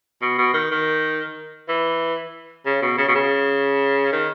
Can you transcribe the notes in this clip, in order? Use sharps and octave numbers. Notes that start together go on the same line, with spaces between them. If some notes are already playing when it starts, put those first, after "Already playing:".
B2
B2
D#3
D#3
E3
C#3
B2
C#3
B2
C#3
D#3